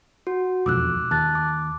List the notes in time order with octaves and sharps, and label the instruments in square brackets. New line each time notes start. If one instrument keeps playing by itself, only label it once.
[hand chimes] F#4
[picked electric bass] E1 B1 F2 [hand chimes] D6 E6 F#6
[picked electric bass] D#2 [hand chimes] A5 F#6 A6
[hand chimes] D6